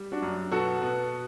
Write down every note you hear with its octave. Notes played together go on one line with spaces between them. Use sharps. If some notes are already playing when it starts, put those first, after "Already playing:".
Already playing: G3
D4 F#4
F#2
B2 F#4 A4
B2